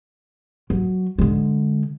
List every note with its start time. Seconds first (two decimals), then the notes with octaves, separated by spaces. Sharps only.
0.70 F#3
1.19 D3 G#3